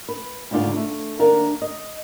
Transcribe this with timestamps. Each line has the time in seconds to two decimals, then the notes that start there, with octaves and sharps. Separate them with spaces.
0.09 B4
0.51 D2 G#2 C#3 D4 F4
0.76 A3
1.19 D#2 D4 A#4 F5
1.62 D#5